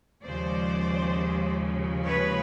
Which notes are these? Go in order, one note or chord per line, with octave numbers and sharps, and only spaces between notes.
D#2 C#3 F3 G#3 C5 D5
B4 C#5